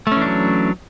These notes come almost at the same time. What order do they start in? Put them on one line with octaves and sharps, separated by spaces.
A3 C#4 E3 D4 F#3